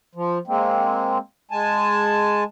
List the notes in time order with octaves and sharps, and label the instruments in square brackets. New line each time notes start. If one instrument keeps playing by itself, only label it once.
[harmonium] F3
G#3 A#3 C4
G#3 G#5 A5